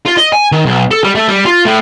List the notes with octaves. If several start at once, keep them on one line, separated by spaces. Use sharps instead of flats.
F4
D#5
G#5
D#3
B1
A4
G3
A3
G3
F4
A2